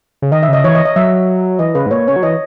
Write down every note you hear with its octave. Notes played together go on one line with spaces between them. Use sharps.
C#3
D#3 D#5
E5
C#3 D#5
E3 C#5
D#5
D#5
F#3 E5
E3 D#5
C#3 B4
G#2
A#2 C#5
C#3 C#5
F#3
E3 D#5